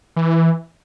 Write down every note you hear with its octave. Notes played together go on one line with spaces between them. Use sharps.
E3